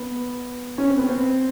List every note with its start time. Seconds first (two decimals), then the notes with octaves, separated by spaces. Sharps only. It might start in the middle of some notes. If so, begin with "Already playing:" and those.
Already playing: B3
0.78 C#4
0.88 C4
0.98 B3
1.09 C4